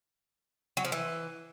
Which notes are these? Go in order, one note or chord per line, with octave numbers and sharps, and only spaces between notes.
F#3
F3
E3